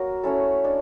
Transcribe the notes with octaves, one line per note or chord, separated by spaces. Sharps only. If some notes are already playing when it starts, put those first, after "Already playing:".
Already playing: F#3 A#3 F#4 A#4
A3 C#4 E4 A4
D4